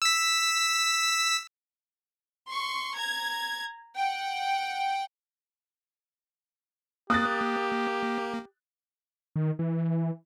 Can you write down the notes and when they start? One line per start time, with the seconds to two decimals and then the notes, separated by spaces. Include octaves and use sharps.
0.02 E6 B6
2.47 C6 C#6
2.95 A#5 G#6
3.97 F#5 G5
7.10 A#3 G4 D#6 F#6 A6
9.36 D#3
9.59 E3
9.78 E3